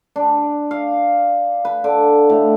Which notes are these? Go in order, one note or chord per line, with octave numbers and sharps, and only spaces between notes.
D4
F5
B4
D3
A2